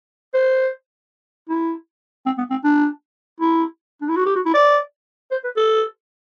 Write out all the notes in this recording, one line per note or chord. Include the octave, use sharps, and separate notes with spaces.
C5
E4
C4
B3
C4
D4
E4
D4
E4
F#4
G4
F#4
E4
D5
C5
B4
A4